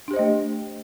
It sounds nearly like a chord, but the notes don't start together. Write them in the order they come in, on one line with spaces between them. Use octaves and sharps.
D4 G4 C5 D#5 A3